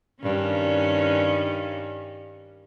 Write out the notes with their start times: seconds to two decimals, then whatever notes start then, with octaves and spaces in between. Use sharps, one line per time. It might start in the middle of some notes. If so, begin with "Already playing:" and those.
0.22 G2 D#3 C#4